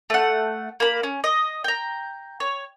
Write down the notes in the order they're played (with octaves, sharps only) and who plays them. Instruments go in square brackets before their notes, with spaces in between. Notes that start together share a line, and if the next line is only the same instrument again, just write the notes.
[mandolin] A3 F#5
A#3 B5
C#4
D#5
G5 A#5
C#5